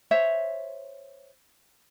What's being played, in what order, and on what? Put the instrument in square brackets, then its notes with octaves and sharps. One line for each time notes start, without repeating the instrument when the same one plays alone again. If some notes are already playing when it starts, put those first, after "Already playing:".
[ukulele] C5 C#5 E5